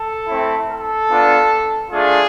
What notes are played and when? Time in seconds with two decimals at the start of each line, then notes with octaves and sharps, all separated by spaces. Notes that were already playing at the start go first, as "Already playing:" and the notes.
Already playing: A4
0.28 A3 C4 E4
0.69 A4
1.10 B3 D4 F4
1.90 A3 D4 F4 G#4